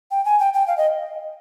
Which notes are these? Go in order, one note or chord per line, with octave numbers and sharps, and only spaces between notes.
G5
G#5
G5
G5
F5
D#5